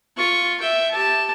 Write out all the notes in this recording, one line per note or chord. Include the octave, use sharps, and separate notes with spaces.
F4 C#6
E5 G5
G4 A5